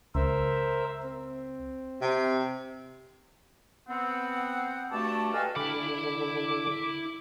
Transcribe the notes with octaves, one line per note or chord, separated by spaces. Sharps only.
C#2 A#4 C5 E5
C4
C3
B3 C4 F#5
G2 A3 F#4 D5 A5
G4 A4 B4 D#5 F5 G#5
D3 E4 B5 D6